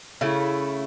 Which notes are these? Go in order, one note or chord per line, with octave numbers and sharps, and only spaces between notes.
C#3 A3 E4